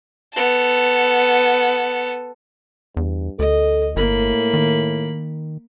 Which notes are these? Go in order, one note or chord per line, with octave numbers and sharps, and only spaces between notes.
B3 A4
E2 G2
D2 A4 D#5
G1 A2 A#3 B5
D#3